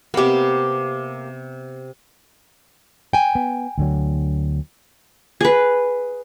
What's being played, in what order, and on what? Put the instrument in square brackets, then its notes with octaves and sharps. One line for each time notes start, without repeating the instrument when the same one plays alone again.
[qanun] C3 B3 [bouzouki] A#3 G4
[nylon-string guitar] G5 G#5
[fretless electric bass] B3
D2 D3 F#3
[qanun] G#4 B4